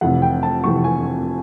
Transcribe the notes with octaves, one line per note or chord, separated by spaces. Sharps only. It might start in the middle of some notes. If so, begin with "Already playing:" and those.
F1 F2 C3 E3 F#5
G5
A5
F1 F2 C3 E3 C#6
G#5